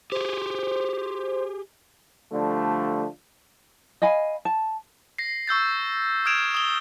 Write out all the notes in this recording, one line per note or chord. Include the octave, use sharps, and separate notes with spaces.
G4 G#4 C5
D3 F3 G3 A3
D#5 F5 G#5 B5
A5
A#6 C7
C#6 E6 G6 A6
D#6 F6 G#6 D7 E7 F7
D#6 G7